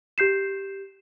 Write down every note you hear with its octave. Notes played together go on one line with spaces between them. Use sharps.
G4 G6 C7 E7